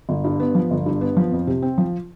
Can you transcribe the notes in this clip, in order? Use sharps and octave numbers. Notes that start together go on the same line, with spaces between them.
G1
G2
B3
F3
G1
G2
B3
F3
F2
C3
C4
F3